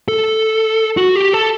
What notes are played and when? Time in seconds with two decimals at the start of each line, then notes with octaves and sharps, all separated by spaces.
0.08 A4
0.97 F#4
1.16 G4
1.33 A4